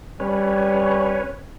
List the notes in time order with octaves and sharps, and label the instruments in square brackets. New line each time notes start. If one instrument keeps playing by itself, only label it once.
[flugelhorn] G3 [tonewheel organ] C#4 B4 C#5